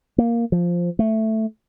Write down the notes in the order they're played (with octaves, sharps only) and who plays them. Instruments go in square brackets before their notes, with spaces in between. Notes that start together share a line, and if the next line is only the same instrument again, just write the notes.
[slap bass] A#3
F3
A3